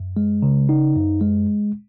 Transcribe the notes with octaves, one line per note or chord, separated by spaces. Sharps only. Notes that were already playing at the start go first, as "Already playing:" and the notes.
Already playing: F#2
G#3
C#3
D#4
F#2
G#3